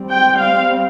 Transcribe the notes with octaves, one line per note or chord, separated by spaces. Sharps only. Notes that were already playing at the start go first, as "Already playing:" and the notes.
Already playing: G3 C4
G5
F5